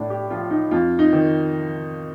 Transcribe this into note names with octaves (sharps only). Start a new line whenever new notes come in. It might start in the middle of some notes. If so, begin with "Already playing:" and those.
Already playing: A2 D4
G4
F3 F4
D#4
F2 F4
D#4
D#3